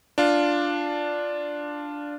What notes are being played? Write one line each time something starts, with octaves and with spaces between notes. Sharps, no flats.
D4 F4